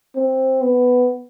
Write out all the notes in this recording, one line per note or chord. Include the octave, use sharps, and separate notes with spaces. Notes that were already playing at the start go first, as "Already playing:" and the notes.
C4
B3